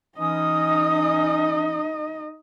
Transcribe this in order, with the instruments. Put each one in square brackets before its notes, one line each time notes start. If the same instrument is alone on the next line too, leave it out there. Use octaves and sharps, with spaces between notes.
[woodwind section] E3 C#4 D#6 [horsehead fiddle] D#4 D#5